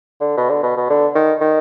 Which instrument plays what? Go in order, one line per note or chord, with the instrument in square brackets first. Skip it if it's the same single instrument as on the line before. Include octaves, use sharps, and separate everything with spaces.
[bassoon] D3
B2
D3
B2
B2
D3
D#3
D#3